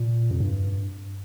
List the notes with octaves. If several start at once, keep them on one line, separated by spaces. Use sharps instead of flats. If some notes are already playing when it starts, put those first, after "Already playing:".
Already playing: A#2
F2
G2